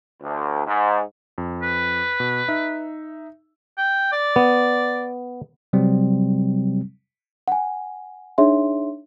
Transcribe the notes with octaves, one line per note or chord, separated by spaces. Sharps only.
D2
G#2
F2
B4
B2
D#4 E5
G5
D5
B3
C3 F#3 G3 C4
F#5 G#5
D4 D#4 G#4 C#5 E5 C6